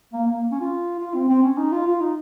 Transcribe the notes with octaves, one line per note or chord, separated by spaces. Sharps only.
A#3
A#3
C#4
F4
F4
C4
C4
C#4
D#4
F4
F4
D#4